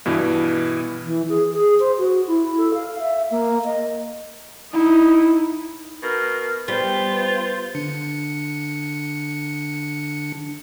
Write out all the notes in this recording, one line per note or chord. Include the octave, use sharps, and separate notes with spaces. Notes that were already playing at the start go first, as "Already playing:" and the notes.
G2 B2 E3
E3
G#4
G#4
C5
F#4
E4
A4
F5
E5
A#3
D#5
D#4 E4
B2 A#4
G3 B3 F4 C5
D3 D4 C#7